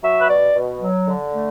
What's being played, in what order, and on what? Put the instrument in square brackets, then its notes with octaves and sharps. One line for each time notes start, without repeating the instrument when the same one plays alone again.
[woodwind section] F#3 E5
B4
B2 D5
B2
F#3
D3
A3